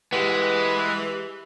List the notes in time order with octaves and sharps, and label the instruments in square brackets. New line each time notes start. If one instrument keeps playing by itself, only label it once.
[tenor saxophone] E3 [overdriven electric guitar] G#3 [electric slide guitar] G4 G#4 F#5 [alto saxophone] B4